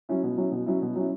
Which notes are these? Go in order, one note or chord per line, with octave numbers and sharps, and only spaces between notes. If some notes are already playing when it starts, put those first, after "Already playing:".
F#3 C#4 E4
B2
F#3 C#4 E4
B2
F#3 C#4 E4
B2
F#3 C#4 E4